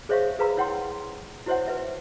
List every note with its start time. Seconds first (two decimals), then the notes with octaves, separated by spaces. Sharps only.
0.09 G#4 C5 C#5 E5 F5 C#6
0.39 G#4 B4 F5 A#5 B5 E6
0.57 E4 C#5 F#5 G5 C6
1.46 E4 F#4 C5 C#5 E5 F#5
1.68 B4 E5